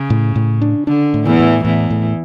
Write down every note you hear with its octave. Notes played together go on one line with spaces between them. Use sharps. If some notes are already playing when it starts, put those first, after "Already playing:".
Already playing: C#3
A2
A2
D4
D3 D4
A2
E2 E3
A2
E2 A2 E3
A2